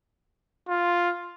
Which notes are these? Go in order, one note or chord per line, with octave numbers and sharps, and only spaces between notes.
F4